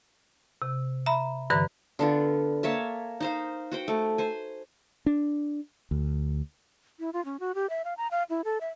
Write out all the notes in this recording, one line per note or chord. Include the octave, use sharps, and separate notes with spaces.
C3
E5 A#5 B5
G2 D3 E3 B4 A#5
D3 B3 F4
A#3 C#5 E5 A5
D#4 C5 F5
F#4 C5 G5
A3
C5 G#5
D4
D2
E4
F4
C#4
F#4
G4
E5
F5
A#5
F5
E4
A4
E5